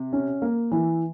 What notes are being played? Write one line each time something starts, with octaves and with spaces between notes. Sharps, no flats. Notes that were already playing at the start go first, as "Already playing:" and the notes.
Already playing: C3
C#4
A#3
E3